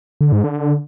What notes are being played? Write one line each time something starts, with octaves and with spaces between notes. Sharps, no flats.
D3
G#2
D3